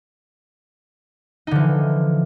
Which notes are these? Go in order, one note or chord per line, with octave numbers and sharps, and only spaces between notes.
D3 E3 F3 D#4